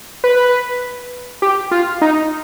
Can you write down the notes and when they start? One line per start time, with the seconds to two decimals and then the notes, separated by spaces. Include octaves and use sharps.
0.24 B4
1.42 G4
1.71 F4
2.02 D#4